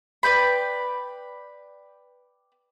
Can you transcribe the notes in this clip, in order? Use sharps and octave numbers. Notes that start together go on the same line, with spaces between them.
B4 D5 G5 B5